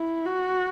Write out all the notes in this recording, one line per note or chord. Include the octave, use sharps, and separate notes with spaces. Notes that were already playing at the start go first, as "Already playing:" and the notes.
Already playing: E4
F#4